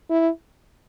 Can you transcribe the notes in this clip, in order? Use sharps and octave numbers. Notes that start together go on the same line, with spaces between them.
E4